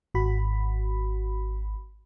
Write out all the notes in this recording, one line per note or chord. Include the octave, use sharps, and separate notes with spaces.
G#1 F#4 B5